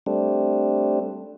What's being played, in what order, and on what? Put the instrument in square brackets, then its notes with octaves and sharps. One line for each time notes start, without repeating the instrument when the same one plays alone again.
[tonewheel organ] G3 A3 C4 D4